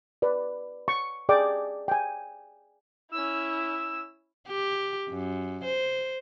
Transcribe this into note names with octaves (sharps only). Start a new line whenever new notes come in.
B4 D5
C#6
G#4 D5 G5 D6
G5 G#5
C#4 E4 E6
G4
F#2
C5